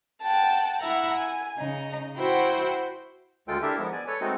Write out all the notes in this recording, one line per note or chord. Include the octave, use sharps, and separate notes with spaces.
F#5 G5 A5
E4 E5 F#5 A#5
G#5
C#3 D#4
E4 F#4 C5 F#5 G5
D2 G#3 F4 A4 G5
D4 E4 G4 A4 A#4 E5
F3 G#3 B3
D5 G#5
A4 B4 C#5
G#3 A3 C4 D#4 F#4 A4